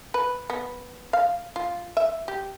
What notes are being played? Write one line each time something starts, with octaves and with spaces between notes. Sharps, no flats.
B4
B3
F5
F4
E5
G4